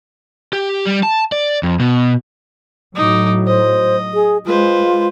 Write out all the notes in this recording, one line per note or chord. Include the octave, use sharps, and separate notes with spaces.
G4
G3
A5
D5
F2
B2
A2 F#3 D#4 D6
C5 D#5
G#4
G#3 F4 B4 C5